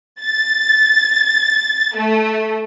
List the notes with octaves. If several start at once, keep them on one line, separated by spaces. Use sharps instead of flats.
A6
A3